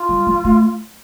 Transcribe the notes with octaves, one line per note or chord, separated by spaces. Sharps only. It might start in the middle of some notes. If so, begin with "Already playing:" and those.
Already playing: F4
G3
F3
A3